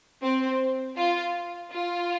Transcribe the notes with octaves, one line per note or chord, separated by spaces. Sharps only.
C4
F4
F4